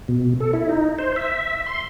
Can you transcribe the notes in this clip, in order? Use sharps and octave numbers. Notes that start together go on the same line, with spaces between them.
B2
A4
E4
D#4
C5
E5
C6